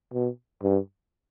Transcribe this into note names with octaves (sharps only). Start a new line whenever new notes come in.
B2
G2